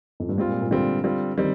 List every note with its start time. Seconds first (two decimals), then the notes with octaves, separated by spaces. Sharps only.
0.20 F2
0.29 G2
0.38 G#2 G3 C4 F4
0.49 A#2
0.60 A#2
0.71 D3 G3 C4 F4
1.04 G3 C4 F4
1.38 D#3 G3 C4